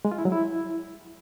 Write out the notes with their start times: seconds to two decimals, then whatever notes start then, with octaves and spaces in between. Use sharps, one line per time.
0.05 G#3
0.11 F4
0.18 E4
0.25 F#3
0.32 E4